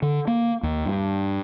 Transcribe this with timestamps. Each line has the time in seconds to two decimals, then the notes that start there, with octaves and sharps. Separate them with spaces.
0.02 D3
0.27 A#3
0.63 D#2
0.85 G2